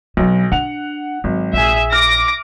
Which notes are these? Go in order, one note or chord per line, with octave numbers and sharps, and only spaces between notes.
B1 F#3 C4
D4 F#5 F7
G#1 F#3
A#1 G#4 E5
D6 F6 A#6